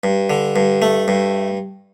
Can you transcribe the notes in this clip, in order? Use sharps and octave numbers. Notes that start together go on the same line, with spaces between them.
G2
D3
G2
A3
G2